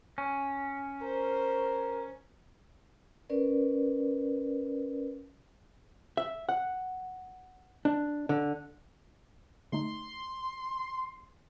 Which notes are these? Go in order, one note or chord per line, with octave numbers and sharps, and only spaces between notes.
C#4
A#4 C5
C#4 A#4 B4 D5
E5
F#5
D4
D3
D3 A3 D#4 C6